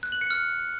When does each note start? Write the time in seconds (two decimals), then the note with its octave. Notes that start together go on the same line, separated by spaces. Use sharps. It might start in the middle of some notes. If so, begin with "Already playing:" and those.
0.03 F#6
0.12 F#7
0.21 C#7
0.31 F6